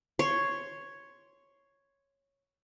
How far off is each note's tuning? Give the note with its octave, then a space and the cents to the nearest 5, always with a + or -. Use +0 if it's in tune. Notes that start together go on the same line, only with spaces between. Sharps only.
C#5 +0 C6 +0